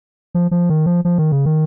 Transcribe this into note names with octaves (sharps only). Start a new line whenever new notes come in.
F3
F3
D#3
F3
F3
D#3
C#3
D#3